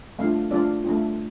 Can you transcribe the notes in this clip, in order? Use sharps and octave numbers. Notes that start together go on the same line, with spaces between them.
A3 D4 F4 F5
A3 D4 F4 D5
A3 D4 F4